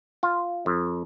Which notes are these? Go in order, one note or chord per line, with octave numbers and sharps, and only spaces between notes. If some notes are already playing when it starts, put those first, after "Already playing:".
F4
F2